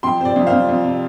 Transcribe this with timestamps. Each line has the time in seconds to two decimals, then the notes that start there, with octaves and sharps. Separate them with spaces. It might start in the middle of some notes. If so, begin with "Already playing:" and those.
0.03 F2 G5 C6
0.20 C3 C5
0.25 D5
0.36 F2
0.47 C5 F5
0.52 F2
0.69 F2
0.84 C3